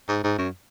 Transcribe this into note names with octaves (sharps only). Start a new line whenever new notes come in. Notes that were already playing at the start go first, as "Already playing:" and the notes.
G#2
G#2
F#2